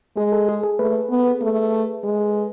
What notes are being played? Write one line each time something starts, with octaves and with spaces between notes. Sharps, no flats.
G#3 G#4
A4
G#4
G#4
A3 B4
B3
A3
G#3